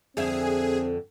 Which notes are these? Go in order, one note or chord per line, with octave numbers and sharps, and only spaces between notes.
F2 D3 C4 G#4 E5